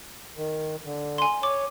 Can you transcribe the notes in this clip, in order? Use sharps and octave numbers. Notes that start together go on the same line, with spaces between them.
D#3
D3
G#5 C6
C#5 D6